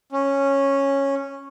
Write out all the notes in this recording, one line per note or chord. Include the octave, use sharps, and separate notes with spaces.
C#4